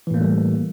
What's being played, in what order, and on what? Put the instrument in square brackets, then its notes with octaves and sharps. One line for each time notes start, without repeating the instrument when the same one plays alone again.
[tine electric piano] E3
A2
A#3
A3
G3